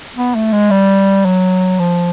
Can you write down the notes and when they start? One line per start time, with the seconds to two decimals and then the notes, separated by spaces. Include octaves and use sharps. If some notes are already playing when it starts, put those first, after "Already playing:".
0.16 B3
0.35 A3
0.53 G#3
0.70 G3
1.25 F#3
1.79 F3